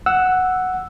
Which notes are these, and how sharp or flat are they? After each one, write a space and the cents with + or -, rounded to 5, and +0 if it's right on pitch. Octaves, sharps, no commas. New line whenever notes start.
F#5 +0 E6 +0